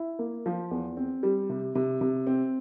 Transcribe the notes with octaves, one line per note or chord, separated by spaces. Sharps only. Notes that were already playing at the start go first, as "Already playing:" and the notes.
Already playing: E4
A#3
F3
E2
C4
G3
C3
C3
C3
C4